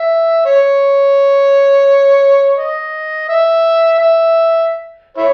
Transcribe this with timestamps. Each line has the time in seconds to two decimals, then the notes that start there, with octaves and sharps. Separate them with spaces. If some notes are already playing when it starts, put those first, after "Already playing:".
Already playing: E5
0.45 C#5
2.57 D#5
3.29 E5
3.98 E5
5.17 E4 C#5